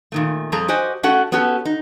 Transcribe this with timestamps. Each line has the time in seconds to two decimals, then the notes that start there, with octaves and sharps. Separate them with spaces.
0.12 A#2 D#3 A3
0.52 F2 G3 G#4 A4 A#5
0.68 F#4 G4 C5 D#5 G#5
1.03 A3 C#4 F#4 A4 F#5 G5
1.32 B3 C#4 F#4 G4 A4
1.65 D#4